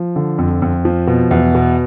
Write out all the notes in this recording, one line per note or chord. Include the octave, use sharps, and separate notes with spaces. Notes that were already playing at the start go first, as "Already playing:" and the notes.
Already playing: F3
D3
F2
F2
F3
B2
E2
B2